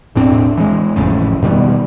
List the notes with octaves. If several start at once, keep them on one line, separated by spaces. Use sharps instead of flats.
E1 A2 C4 D4
E3 G#3
G#1 F2 A2 C#3
B2 D#3 G3 B3